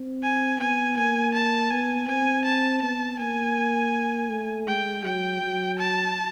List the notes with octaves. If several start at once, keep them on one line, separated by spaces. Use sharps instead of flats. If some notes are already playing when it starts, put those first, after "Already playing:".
Already playing: C4
G#5
B3 G#5
A#3 G#5
A5
B3 G#5
C4 G#5
A5
B3 A5
A#3 G#5
A3
G#3 G5
F#3 G5
F#3
A5